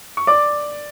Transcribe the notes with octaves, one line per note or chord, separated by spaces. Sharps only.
C#6
D5 D6